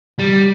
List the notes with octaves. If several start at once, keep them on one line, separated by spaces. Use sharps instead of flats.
G3